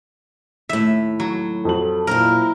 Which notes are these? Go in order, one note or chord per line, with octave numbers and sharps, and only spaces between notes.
D#2 A2 E5
F#3
F2 F#4 A4 F#7
A#2 C4 D#4 E4 A#4